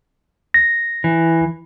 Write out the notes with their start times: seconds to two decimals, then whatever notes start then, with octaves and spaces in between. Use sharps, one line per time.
0.54 A#6
1.04 E3